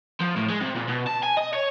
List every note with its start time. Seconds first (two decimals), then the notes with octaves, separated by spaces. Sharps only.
0.20 F3
0.36 A2
0.50 G#3
0.62 C3
0.76 A#2
0.89 B2
1.07 A5
1.23 G#5
1.37 D#5
1.53 C#5